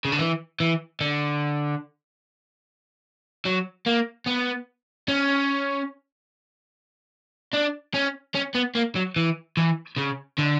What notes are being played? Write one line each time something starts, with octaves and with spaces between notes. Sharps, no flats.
C#3
D3
E3
E3
D3
F#3
A#3
B3
C#4
D4
C#4
C#4
B3
A#3
F#3
E3
E3
C#3
D3